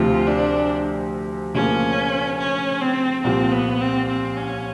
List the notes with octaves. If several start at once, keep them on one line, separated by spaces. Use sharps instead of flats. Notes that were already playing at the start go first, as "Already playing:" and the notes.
Already playing: D2 C3 F3 F4
D4
D2 C#3 F3 A#3 C#4
C#4
C4
C2 A#2 F3 C4
B3
C4
C4
C#4